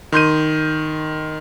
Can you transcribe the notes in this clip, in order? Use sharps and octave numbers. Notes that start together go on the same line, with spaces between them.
D#3 C6 G6 D#7